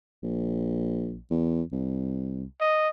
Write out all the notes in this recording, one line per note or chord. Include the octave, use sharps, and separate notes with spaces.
A#1
E2
C2
D#5